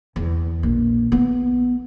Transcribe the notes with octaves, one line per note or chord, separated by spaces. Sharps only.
E2
A#1
B3